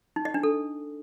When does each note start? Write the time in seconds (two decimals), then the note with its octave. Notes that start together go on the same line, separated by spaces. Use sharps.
0.16 D#4
0.25 D#5
0.34 D4
0.43 A4